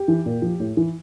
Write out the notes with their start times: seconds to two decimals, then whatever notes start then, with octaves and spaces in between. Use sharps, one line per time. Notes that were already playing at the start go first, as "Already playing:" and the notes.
Already playing: G4
0.08 E3
0.26 A#2
0.42 F3
0.60 A2
0.77 E3